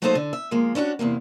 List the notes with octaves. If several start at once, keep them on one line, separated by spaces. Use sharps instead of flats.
F#3 A3 A#3 D#4 A4 C5
D3
E5
F3 G#3 A#3
C#4 D4 E4 F#4 G4
E2 G#2 C3 A#3